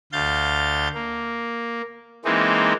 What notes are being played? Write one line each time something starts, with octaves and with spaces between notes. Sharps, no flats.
D2 F5 G6 A6
A#3
E3 G#3 A#3 C4 D#4